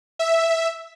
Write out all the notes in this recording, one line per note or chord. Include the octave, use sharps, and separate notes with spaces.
E5